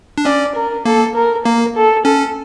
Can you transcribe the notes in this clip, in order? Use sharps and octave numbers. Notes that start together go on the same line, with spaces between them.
D4
C#4 D5
A#4
A#3 A4
A#4
A#3 A#4
A4
C#4 A4